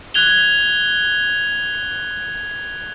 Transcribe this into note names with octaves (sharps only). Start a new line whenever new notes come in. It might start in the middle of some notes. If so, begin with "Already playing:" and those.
F#6 G#6 F7 G7